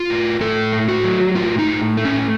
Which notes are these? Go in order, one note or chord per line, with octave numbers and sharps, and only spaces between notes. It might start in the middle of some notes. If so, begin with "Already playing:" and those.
Already playing: F4
A2
A2 A4
A3
F#4
F#3
A2 F4
D#4
A2
A3
C#4